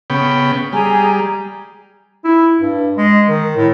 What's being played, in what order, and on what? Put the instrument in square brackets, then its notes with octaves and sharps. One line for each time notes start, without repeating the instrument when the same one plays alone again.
[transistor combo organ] C#3 B3 G5
[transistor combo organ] G3 [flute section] G#4 G#5 A#5
[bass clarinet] E4
G2
G#3
D#3
A2